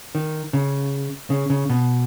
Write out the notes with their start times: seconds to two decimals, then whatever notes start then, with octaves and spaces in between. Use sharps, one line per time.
0.15 D#3
0.53 C#3
1.30 C#3
1.50 C#3
1.70 B2